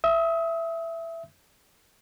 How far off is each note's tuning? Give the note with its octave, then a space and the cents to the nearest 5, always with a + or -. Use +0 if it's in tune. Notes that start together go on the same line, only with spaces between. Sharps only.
E5 +10 D#6 +35